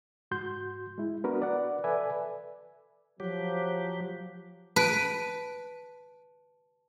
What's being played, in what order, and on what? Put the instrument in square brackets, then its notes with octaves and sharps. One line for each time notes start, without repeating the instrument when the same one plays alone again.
[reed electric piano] G#2 F#4 C6 G6
G#3 E4
B3 D4 F#4 A#4 B4
D5 F#5
A4 B4 D5 E5 G#5
[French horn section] F3 [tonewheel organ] F#3 G4
[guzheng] B4 [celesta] A5 D7 D#7